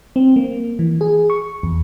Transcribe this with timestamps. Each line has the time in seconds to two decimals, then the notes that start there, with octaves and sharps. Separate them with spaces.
0.16 C4
0.36 A#3
0.79 E3
1.01 G#4
1.30 C#6
1.63 E2